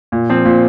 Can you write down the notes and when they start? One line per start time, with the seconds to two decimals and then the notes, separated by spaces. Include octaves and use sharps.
0.12 A#2
0.30 F3 C4
0.45 A#2